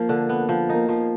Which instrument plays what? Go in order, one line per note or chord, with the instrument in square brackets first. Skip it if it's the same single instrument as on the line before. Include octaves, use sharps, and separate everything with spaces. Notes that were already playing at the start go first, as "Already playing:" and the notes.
Already playing: [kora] F3 [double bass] A#3
[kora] D3
B3
F3
[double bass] A#3 [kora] D#4
[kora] F3